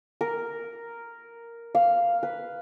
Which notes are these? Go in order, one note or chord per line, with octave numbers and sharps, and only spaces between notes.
A#4
F5
B4